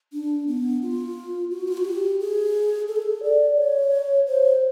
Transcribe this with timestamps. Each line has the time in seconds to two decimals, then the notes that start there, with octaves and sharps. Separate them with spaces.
0.13 D4
0.47 B3
0.82 F4
1.51 F#4
1.68 F4
1.77 F#4
1.85 G4
2.20 G#4
2.88 A4
2.96 G#4
3.02 A4
3.23 D5
3.58 C#5
4.27 C5